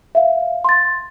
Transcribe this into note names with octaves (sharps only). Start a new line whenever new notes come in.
E5 F5
C6 A6